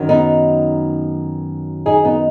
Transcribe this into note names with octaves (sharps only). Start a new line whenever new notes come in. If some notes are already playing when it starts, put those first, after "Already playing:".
Already playing: F#2 D#3 F#3
B3 D#4
D#4 G#4
B3 D#4